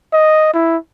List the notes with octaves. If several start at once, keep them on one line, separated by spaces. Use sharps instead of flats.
D#5
E4